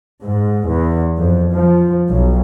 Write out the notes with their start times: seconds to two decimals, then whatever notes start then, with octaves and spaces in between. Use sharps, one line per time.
0.23 G#2
0.68 E2
1.18 F2
1.54 F3
2.09 B1